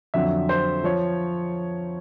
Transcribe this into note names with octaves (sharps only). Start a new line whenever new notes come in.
F2 D3 F#3 E5
C5
F3 C#5